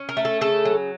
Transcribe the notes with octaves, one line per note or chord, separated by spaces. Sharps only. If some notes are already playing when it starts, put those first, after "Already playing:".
Already playing: C#4
A#4
A3
A4
C#3 A4
F#3